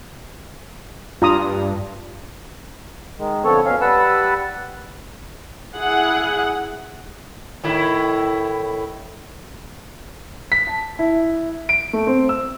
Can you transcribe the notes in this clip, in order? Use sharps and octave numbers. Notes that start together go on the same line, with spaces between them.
G2 F4 A#5 D#6
D#3 G#3
D3 F3 B3 C4 A4 C#5
B2 C#4 F5
G3 B4 F#5 A5 E6
E4 G#4 F#5
A2 D#3 E4
B6
A5
E4
D7
A3
C4
E6